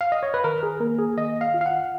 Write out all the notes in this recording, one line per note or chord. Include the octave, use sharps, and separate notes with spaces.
F5
D#5
C#5
B4
D#3 A#4
G#4
A#3 A#4
G#4
D#3 D#5
F5
F4
F5
F#5